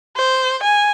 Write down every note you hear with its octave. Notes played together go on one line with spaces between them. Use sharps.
C5
G#5